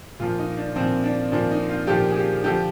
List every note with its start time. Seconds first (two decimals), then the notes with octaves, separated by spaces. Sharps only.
0.20 A#2 F3 F4
0.39 D#4
0.57 D4
0.76 A#2 F3 C4
1.04 D4
1.32 A#2 F3 D4
1.51 D#4
1.69 F4
1.87 A#2 F3 G4
2.11 G#4
2.16 G4
2.44 D3 F3 G4